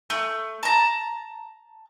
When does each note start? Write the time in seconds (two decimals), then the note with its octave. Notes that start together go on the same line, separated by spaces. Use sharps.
0.10 A3
0.63 A5 A#5